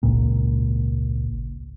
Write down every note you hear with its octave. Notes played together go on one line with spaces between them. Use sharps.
G#1 C#2 A#2